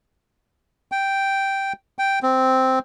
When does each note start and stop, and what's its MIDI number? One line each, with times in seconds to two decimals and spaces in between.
0.92 1.73 79
1.99 2.19 79
2.23 2.79 60